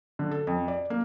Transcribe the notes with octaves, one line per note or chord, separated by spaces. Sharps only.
D3
A4
F2
D5
A#3